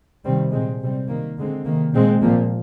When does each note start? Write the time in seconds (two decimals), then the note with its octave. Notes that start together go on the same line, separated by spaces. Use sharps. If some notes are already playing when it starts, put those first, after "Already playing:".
0.24 C3 D#3 G3 C4
0.52 A#2 G#3 C4
0.80 C3 G3 C4
1.08 D#3 A#3
1.37 D3 G#3 C4
1.64 C3 D#3 A#3
1.92 A#2 G#3 C4
2.21 A#2 F3 A#3